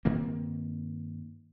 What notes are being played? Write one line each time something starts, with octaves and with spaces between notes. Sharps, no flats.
G2 D#3 A#3 C4